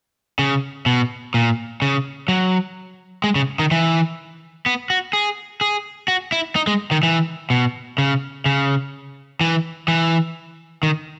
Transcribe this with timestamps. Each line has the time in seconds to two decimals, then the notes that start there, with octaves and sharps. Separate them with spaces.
0.39 C#3
0.86 B2
1.34 A#2
1.82 C#3
2.28 F#3
3.24 G#3
3.35 C#3
3.59 D#3
3.71 E3
4.66 B3
4.90 F#4
5.13 G#4
5.61 G#4
6.08 F#4
6.32 E4
6.56 D#4
6.67 G#3
6.91 D#3
7.03 E3
7.50 B2
7.98 C#3
8.46 C#3
9.41 E3
9.88 E3
10.83 D#3